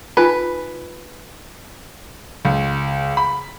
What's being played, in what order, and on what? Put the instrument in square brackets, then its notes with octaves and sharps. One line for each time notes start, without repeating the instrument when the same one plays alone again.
[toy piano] D#4 F4 G#5 [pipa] B4
[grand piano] C#2
B5